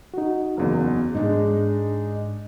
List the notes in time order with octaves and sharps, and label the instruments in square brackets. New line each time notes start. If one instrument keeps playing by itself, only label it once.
[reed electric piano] D#4 F#4
[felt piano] F#1 E2
[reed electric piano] G#2 [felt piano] G#3 D4 D#4